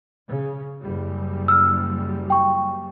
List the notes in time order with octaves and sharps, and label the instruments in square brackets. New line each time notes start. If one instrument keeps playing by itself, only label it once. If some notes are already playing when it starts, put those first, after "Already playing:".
[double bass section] C#3
F#1 G3
[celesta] E6 F6
G5 C#6